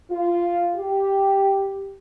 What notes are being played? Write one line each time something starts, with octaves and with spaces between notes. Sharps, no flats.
F4
G4